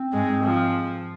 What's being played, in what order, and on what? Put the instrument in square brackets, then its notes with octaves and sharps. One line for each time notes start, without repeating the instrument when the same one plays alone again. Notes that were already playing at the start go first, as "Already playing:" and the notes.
Already playing: [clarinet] C4
[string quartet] G#2 G#3
F3